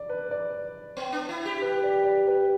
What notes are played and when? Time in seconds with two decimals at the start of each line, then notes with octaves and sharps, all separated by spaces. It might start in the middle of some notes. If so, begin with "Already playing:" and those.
Already playing: D5
0.09 B4
0.31 D5
0.97 B3
1.12 D4
1.29 E4
1.45 G4
1.62 B4
1.84 D5
2.05 D5
2.27 B4